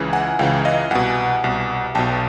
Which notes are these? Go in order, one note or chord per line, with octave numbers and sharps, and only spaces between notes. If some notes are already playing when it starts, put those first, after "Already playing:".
Already playing: C#2 C#3 E3
F#5 G#5
C#2 C#3 E3 F5 G5
D#5 F5
C2 B2 F#5 G#5
C2 B2
B1 B2 G5 A5